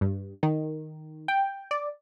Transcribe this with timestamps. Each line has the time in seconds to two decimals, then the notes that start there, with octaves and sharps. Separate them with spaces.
0.01 G2
0.43 D#3
1.28 G5
1.71 D5